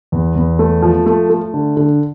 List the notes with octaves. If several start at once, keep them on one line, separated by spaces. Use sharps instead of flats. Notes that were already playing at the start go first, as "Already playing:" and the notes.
E2
E2
A3
F3
A3
A3
D3
D3